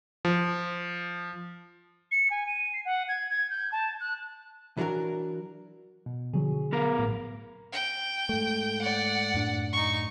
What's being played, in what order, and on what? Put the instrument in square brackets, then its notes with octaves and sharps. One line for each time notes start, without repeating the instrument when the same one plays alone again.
[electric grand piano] F3
[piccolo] C#7
G#5
D#7
C7
F#5
G#6
G#6
G6
A5
F#6
[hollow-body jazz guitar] E3 F#3 D4 F#4 A#4
[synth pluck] B2
[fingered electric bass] D3 [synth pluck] F3 F#3 G#4
[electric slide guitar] B3 A#4
[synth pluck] A1 A2
[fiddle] G5
[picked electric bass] G#2 A3
[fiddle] D5 F#5
[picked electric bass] F#2 A2 D4
[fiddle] D#4 C#6